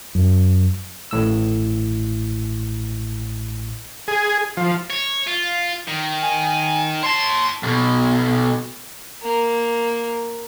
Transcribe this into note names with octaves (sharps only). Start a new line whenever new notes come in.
F#2
A1 A2 E6
G#4
F3
C#5
F4
D#3
G#5
C#5 A5 C6
B1 B2
A#3